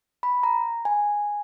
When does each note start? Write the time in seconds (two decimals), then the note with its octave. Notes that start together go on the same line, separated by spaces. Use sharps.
0.23 B5
0.43 A#5
0.85 G#5